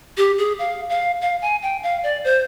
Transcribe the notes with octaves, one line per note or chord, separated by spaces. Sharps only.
G4
G#4
F5
F5
F5
G#5
G5
F5
D5
C5